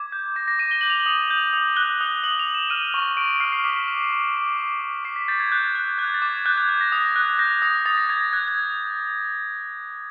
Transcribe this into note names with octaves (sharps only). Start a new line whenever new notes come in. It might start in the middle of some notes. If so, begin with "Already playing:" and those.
Already playing: D6 G#6
G6
D6 A#6
A#6
D6 D#7
G7
G6 F#7
F7
F#7
D#6
G6
D#6
F#6 G7
D#6
D#6 F#7
F7
D#6
E7
F6 D#7
C#6
C#6 D7
F6 C7
C7
D6 B6
D6
D6
D6
D6
D6
D6 C7
B6
G6 A6
G#6
F#6 G6
F#6
F#6 G#6
A6
D6
G#6
F#6 G6
G#6
F#6 G#6
A#6
D#6
F#6
G6 A#6
D#6
D#6 A6
A#6
D#6 G#6
G#6
F#6 G#6
G#6